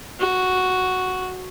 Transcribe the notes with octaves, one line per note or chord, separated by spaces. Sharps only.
F#4